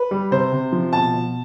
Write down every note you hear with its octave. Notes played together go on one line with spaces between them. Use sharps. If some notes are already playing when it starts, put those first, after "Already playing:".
Already playing: B4
G3
C3 C5
C3
F3
B2 A5
B2